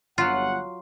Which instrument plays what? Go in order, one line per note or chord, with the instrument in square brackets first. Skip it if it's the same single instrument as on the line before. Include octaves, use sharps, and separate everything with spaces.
[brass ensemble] G1 F#5 [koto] F#3 F4